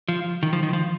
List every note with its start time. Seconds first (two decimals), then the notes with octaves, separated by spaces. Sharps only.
0.08 F3
0.43 D#3
0.53 F3
0.63 D#3
0.73 F3